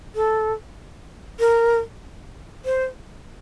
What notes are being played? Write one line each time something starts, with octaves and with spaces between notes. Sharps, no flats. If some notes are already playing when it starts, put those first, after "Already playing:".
A4
A#4
C5